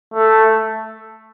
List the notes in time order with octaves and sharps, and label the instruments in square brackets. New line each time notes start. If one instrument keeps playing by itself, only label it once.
[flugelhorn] A3